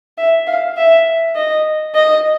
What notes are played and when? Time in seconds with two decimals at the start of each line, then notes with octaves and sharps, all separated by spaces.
0.18 E5
0.47 F5
0.77 E5
1.35 D#5
1.95 D#5